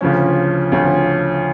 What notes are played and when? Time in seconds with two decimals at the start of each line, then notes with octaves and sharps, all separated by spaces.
0.01 D2 C#3 F3 C#4
0.72 D2 C#3 F3 C#4